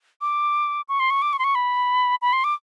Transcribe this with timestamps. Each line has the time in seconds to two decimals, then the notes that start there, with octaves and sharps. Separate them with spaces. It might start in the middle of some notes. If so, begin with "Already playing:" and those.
0.21 D6
0.89 C#6
1.00 C6
1.10 C#6
1.22 D6
1.33 C#6
1.39 C6
1.44 C#6
1.55 B5
2.22 B5
2.33 C6
2.44 D6